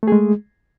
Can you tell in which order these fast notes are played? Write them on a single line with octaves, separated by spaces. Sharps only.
A3 G#4 G#3